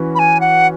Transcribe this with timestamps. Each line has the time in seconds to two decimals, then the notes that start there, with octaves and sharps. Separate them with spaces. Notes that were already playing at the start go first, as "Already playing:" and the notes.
Already playing: E3 C#4 F#4 B4
0.15 B5
0.19 G#5
0.41 F#5